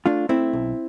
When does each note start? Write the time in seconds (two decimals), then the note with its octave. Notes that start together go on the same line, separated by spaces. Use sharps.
0.06 A3 D4 F4
0.29 A3 C4 E4
0.53 B1